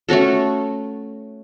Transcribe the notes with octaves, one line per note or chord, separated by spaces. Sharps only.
A3 C#4 F#4 A4